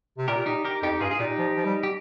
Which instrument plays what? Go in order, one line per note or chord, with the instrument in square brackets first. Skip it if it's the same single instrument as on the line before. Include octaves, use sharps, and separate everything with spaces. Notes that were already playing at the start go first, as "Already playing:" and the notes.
[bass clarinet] C3
[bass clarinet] A#2 [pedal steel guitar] G4 A#4
[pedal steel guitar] D#4 G4
G4 A#4
[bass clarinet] F2 [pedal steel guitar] D#4 G4
[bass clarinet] G2 [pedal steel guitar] F4 G#4
[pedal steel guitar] G#4
[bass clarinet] A#2 [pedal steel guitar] D#4 G4
[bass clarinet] F3
F3
G3
[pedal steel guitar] G4